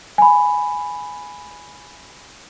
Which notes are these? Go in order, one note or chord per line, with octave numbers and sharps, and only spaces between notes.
G#5 B5